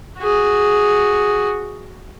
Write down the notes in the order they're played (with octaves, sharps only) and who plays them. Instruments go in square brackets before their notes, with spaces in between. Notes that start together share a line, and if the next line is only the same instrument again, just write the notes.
[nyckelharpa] F#4 G#4